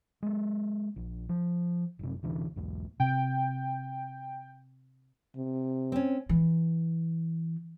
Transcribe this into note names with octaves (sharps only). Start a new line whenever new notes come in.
G#3 A#3
A#1
F3
F#1 C3
D2 C3 E3 D4
B1 E2
C3 G5
C3
C4 C#4
E3